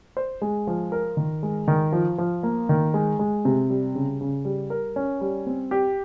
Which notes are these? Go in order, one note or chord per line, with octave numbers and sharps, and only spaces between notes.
C5
G#3
F3
A#4
D#3
G#3
D#3
F3
F3
A#3
D#3
G#3
G#3
C3
G3
C#3
C#3
G3
A#4
C#4
G3
C4
G4